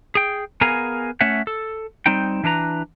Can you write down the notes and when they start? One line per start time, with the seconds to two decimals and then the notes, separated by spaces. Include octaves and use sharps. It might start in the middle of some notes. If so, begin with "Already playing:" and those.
0.15 G#4 G5
0.61 B3 G#4 A#4 F5 G#5 A#5
1.21 A3 C#4 C#5 E5 F#5
1.47 A4
2.06 G3 C4 D#4 G5
2.44 E3 D4 B4 A#5